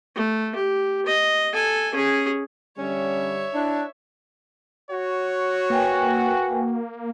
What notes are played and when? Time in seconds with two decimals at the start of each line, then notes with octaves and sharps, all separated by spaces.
0.15 A3
0.55 G4
1.06 D#5
1.53 A4 G#5
1.95 C#4 G#4
2.78 D3 G3 C#4 C#5 E5
3.54 D4 E4
4.91 F#4 C#5
5.70 A#3 B4 G5 G#5